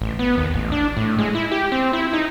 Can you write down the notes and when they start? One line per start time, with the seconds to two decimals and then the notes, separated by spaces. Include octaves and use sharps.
0.01 A1
0.19 B3
0.38 D#2
0.54 A1
0.72 D4
0.97 A2
1.19 G#3
1.35 E4
1.52 G4
1.72 C4
1.93 E4
2.13 D#4